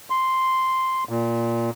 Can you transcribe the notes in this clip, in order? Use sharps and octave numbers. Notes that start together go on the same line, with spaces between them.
C6
A#2